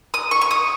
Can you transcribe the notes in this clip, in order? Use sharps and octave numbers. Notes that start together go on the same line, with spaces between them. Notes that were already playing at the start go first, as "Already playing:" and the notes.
D#6
C#6
C#6
D#6